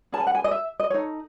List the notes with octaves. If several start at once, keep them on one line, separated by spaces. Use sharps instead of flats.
C#4 G#4 B4 A5
G#5
F#5
G#5
D#5
E5
D#5
D#4 A4 C#5